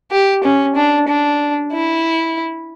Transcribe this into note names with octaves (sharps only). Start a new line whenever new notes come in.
G4
C#4
D4
D4
E4